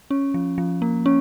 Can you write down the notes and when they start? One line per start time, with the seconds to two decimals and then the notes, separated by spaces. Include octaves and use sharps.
0.10 C#4
0.34 F3
0.58 F3
0.82 A#3
1.06 C#4